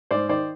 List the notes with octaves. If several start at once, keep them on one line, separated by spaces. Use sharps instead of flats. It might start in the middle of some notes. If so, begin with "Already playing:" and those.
G#2 C5 D5
D#3 C5 D5